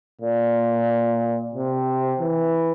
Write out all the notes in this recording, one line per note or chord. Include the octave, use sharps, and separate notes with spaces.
A#2
C3
E3